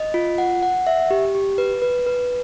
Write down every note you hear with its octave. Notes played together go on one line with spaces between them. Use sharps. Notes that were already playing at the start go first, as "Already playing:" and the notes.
Already playing: D#5
F4
F#5
F#5
E5
G4
G4
B4
B4
B4